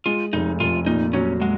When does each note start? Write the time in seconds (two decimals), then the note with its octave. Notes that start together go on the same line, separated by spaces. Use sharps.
0.06 G#3 F4
0.33 F1 D#4
0.60 F1 F4
0.86 A#2 D#4
1.13 F#3 C#4
1.41 G#3 F#4